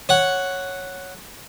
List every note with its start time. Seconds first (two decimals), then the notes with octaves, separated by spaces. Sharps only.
0.09 C#5 F#5